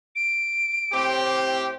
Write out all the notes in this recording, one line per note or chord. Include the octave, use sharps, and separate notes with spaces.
D7
A2 C4 G4